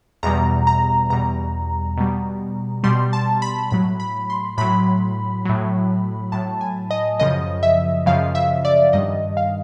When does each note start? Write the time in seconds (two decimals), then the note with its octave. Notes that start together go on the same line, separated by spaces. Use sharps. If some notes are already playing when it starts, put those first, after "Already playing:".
0.23 E2 B2 G3 A#5
0.67 A#5
1.10 E2 B2 G3 A#5
1.97 B2 G3
2.83 B2 G3 C6
3.13 A5
3.42 B5
3.71 A2 F#3 B5
4.00 B5
4.30 C6
4.58 A2 F#3 B5
5.45 A2 F#3
6.32 A2 F#3 A5
6.61 G#5
6.91 D#5
7.20 F#2 C#3 F3 D#5
7.63 E5
8.06 F#2 C#3 F3 F5
8.35 E5
8.65 D5
8.93 G2 D#3 G3 D#5
9.37 F5